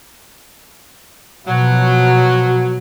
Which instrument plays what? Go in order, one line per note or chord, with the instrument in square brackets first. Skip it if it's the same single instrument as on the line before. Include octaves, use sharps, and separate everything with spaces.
[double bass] B2 F3 [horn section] F#3